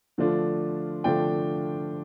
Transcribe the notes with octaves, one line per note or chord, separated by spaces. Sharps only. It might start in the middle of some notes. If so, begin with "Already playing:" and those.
D3 F3 A3 D4 F4
D3 F3 A3 D4 F4 G5